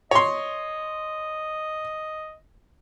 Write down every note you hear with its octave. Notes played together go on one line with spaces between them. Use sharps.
C#5 D#5 C6